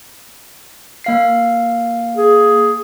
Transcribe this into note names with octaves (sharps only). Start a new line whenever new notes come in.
A#3 F5 C7
G#4